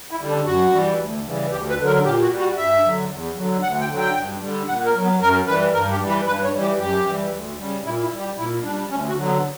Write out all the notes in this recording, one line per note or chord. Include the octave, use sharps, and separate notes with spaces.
E4
D3 G3
D4
F#2 F#4
E3 G3
D2
C#3 E3 G3
D2 G4
B4
D3 F#3
A#4
A#2 G4
F#4
G3
F#4
G2 E5
D3 F#3
E2
D3 F#3
D2 F#5
G5
D3 F#3
G5
G2
D3 G3
A#2 F#5
A#4
F#3
B3
F#2 A#4
E3 G3 B4
G2 A#4
G4
E3 G3
B4
G2 B4
C#5
E3 G3
G4
F#2 G4
E3 G3
D2
C#3 G3
A#2 E4
E4
G3
G4
A#2 E4
G3 D4
D2 C#4
F#4
D3 F#3
B3